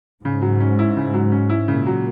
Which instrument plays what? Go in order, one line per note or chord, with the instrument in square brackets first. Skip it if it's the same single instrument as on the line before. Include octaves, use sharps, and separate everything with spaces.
[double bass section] G#2 [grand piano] C#3
[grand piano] F#3
C#4
E4
C#3
F#3
C#4
E4
[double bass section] A#2 [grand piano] C#3
[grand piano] F#3